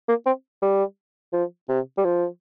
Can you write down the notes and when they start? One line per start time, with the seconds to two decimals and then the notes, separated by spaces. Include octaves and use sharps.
0.09 A#3
0.26 C4
0.62 G3
1.33 F3
1.69 C3
1.97 G3
2.04 F3